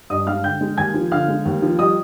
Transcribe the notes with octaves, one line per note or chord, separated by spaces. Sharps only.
G2 D#5 D#6
G#3 F5 F6
D3 G5 G6
G#3
D#2 G#5 G#6
F3
D3 F5 F6
G#3
D#2
F3
G3 D#5 D#6